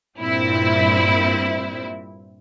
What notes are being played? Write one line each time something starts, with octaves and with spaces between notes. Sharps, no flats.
G2 A#2 C4 E4